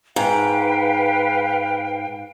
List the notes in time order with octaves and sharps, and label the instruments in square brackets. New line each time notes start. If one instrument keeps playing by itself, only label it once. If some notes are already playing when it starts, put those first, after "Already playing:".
[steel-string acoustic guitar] G#2 [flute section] B4 F5 G5